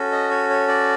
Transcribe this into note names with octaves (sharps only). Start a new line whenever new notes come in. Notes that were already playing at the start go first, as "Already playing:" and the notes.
Already playing: C#4 F#4 A4
D#5
C#5
C#5
D5